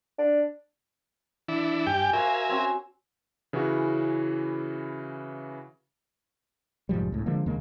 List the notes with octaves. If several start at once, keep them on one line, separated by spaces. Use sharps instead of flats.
D4
E3 D4 E4
G2 G4 G5 G#5
F#4 A#4 C5 E5 F5 G#5
C4 C#4 F#4
C#3 E3 C#4 E4 F#4
F1 G#2 F3 G3
C#2 A2
D3 F3 G#3 A#3
D#2 C#3 G#3 A#3